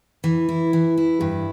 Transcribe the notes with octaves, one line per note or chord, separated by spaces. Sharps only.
E3
E4
E3
E4
G2